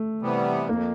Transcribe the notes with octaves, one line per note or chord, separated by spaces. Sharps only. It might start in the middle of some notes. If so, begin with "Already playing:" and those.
Already playing: A3
C3 E3 G3 B3
F2 A#3